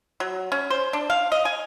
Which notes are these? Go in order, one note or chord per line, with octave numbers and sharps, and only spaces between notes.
F#3
C#4
C5
D4
F5
D#5
G#5